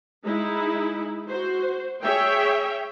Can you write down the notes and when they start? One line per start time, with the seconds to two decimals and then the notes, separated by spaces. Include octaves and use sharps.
0.24 G#3 D#4 E4
1.29 F#4 C5
2.02 G#4 C#5 E5 G5